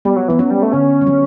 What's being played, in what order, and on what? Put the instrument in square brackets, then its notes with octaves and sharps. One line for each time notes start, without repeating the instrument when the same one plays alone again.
[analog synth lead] G3 [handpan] B3
[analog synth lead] F#3
[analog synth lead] E3 [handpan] B3
[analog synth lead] F#3 [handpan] C#4
[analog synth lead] G3
A3
[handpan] D3 [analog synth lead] C#4
[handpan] G3
F#3